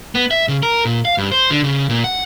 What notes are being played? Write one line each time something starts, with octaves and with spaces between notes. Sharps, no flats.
B3
E5
C#3
A#4
A#2
F5
G2
C5
D3
C#3
A#2
F#5